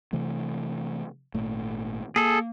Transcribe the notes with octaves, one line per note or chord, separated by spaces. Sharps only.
C3 E3 A3
G#1 A#2 A3
A#3 G#4 A4